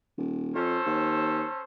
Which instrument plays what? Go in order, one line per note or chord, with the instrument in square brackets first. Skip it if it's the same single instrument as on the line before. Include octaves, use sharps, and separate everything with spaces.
[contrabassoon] D#1
[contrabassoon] F2 [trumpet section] C#4 A4 C5
[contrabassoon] D#2